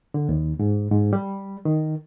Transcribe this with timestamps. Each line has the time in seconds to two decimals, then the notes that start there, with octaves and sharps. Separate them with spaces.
0.14 D3
0.29 D#2
0.60 G#2
0.92 G#2
1.13 G3
1.65 D#3